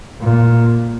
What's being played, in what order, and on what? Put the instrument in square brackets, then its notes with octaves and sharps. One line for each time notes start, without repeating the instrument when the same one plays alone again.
[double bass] A#2